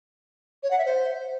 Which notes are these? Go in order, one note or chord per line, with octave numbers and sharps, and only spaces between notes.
C#5
F#5
E5
C5